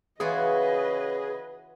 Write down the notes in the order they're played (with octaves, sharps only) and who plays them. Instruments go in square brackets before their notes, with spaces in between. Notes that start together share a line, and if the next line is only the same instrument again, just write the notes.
[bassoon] C#3 [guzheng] E3 F4 F#4 [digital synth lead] G#4 [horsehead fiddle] B4 D#5